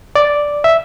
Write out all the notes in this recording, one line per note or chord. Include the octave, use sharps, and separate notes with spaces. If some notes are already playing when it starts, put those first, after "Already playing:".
D5
E5